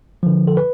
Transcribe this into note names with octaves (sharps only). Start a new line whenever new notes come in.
D3 F3
A4
B4